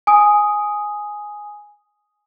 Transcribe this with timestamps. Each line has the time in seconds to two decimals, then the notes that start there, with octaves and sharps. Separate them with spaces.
0.07 G#5 D#6